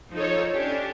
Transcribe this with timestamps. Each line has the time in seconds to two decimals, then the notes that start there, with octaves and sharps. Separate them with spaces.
0.13 F3 D#4 A4 C#5
0.53 C#4 D4 G4